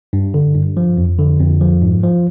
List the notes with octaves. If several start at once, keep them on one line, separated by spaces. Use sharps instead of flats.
G2
D3
G2
F3
F2
D3
F2
F3
G#2
F3